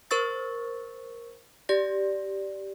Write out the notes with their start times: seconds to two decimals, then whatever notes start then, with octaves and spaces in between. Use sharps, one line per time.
0.11 A#4 C5 C#6 E6 A6
1.69 G4 D5 A#6